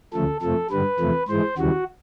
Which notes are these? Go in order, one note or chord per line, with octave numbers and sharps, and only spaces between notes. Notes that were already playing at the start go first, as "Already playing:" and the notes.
D2 C#3 F3 A3 A4
F2 C3 F3 A3 A4
G2 D3 G3 B4
E2 C3 F3 A3
G#2 E3 G#3 C5
D#2 C#3 E3 G3 F#4